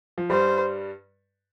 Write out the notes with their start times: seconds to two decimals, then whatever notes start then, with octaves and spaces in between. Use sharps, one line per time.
0.18 F3
0.30 G2 G3 C5